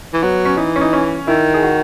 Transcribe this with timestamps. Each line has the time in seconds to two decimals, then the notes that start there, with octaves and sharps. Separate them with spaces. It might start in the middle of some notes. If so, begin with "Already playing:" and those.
0.14 E3
0.23 F#3 B3
0.45 C#4
0.57 E3 D#4
0.76 C#4
0.81 D#4
0.93 C#4
1.27 D#3 E4
1.54 G#4
1.63 F#4